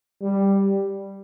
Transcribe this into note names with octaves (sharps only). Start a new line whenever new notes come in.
G3